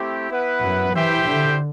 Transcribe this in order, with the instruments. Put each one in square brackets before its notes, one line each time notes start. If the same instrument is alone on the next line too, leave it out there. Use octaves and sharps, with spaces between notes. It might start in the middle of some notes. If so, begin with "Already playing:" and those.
Already playing: [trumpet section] A3 C4 E4 G4
B3 E4 B4 F#5
[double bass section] F#2
[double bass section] E3 [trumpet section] E4 G4 C5 E5 G5
[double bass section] D3